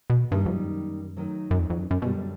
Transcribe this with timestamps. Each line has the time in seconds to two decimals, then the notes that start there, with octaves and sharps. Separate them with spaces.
0.10 B2
0.31 G2 D#3 G3 A#3 D#4
0.46 F2
0.52 F#2
1.17 D#3 F#3 A3
1.51 F#2
1.59 F2
1.70 F2
1.80 F#2
1.91 F#2
2.02 F#2 B2 D3 G3